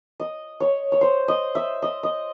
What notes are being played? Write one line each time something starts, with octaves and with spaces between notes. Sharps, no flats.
D#5
C#5
C#5
C5
D#5
E5
D#5
D#5